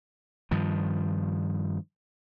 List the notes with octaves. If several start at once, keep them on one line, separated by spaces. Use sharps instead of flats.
G2 D#3 F3